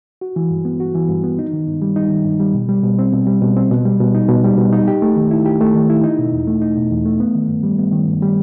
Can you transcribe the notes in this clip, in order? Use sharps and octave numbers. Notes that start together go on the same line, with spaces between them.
F#4
E3
G2
B3
F#4
E3
G2
B3
D#4
D#3
G2
G3
D#4
D#3
G2
G3
B2
G3
B2
C4
B2
G3
B2
C4
B2
G3
B2
D#4
B2
G3
B2
D#4
G4
A3
D#3
E4
G4
A3
D#3
E4
D#4
B2
E2
A3
D#4
B2
E2
A3
B3
D#3
G2
G3
B3
D#3
G2
G3